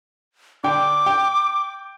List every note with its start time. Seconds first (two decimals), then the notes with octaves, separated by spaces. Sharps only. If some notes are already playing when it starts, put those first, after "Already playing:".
0.64 D3 G5 D6
1.06 G5